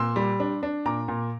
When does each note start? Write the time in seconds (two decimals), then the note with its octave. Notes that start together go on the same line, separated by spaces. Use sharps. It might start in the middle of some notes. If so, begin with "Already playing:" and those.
Already playing: A#2 C6 E6
0.16 G3
0.40 D4
0.63 D4
0.85 A#2 A#5 D6
1.08 A#2